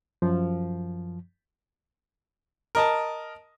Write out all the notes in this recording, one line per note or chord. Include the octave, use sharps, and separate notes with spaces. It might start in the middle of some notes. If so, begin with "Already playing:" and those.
F#2 F3
A#4 D#5 A5